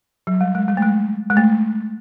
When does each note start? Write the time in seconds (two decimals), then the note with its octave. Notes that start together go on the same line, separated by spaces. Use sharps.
0.27 F#3
0.41 G3
0.55 G#3
0.68 G3
0.77 A3
0.82 G#3
1.30 G#3
1.37 A3